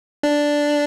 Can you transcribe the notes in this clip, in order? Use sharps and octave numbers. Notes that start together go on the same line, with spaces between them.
D4